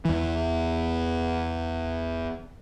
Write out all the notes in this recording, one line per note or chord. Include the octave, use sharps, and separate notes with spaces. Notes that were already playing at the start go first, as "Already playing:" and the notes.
E2 E3